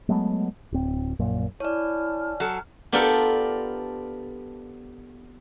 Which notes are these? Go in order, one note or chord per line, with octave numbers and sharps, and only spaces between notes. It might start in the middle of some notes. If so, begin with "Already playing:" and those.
F#3 G#3 A3 B3
D1 C4
A#1 F#2 A#2
E4 C#5 D5 G#5 A5 F6
F#3 A4
B3 D4 F4 G4 A4 A#4